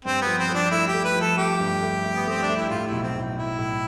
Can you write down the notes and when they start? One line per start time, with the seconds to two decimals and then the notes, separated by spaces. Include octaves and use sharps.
0.05 G2 C4
0.22 B3
0.27 F3
0.38 C4
0.49 F3 D4
0.71 A3 E4
0.87 G4
0.94 A3
1.05 B4
1.15 F3
1.21 A4
1.37 A3 G4
1.60 G2
1.82 A3
2.04 A3
2.15 B3
2.26 A3 C4
2.42 D4
2.49 A3
2.57 E4
2.70 A2 F4
2.87 B1 E4
3.03 C4
3.15 A2
3.36 A2 E4
3.58 A2